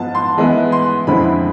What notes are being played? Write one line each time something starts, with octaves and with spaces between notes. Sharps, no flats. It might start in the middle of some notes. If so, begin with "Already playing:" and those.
Already playing: G#2 F3 B3 F4 A5
C6
E3 G#3 B3 E4
C6
F2 D3 G#3 C4 E4 B5